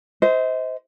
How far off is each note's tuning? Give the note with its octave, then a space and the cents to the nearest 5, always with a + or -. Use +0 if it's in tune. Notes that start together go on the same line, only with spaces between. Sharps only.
C5 -15 D#5 +40